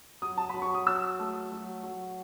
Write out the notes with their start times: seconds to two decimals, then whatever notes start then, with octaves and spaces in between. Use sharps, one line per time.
0.22 F#3 D#6
0.37 A5
0.49 F#3 B5
0.62 C#6
0.74 D#6
0.87 F#3 E6
1.19 A3
1.52 F#3
1.83 F#3